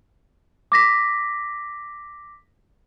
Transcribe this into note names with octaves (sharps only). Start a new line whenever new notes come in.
D6 A#6 B6